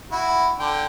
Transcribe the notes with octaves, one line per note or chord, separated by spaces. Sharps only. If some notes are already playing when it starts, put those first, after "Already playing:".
E4 F#4
D3 G5